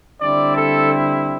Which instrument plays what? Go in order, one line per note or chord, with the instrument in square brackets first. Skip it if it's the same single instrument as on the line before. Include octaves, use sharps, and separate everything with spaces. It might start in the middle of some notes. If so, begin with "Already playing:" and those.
[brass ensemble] D3 G3 C4 E4 D5
A4